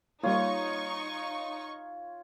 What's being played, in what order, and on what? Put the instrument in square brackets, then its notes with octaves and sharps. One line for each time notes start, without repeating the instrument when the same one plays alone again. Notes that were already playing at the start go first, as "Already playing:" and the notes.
[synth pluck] G3 A#3 [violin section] D#4 C#6 [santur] F4 [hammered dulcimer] C#5